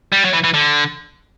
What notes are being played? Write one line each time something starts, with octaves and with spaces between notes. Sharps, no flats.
G3
F#3
E3
E3
D3